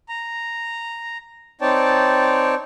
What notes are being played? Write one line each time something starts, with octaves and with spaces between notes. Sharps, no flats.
A#5
C4 D#4 C#5 D5 G5 A5